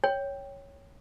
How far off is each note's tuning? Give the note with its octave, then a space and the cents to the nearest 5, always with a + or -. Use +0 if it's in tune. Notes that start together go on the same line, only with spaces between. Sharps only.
C#5 +0 G5 +0